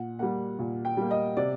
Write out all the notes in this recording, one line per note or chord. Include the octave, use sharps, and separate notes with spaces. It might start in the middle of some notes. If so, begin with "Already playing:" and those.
Already playing: A#2 F#5
G3 A#3 F#5
A#2
G5
G3 A#3
D#5
C3 D5